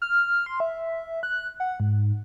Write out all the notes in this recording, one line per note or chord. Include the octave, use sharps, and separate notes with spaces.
F6
C6
E5
F#6
F#5
G#2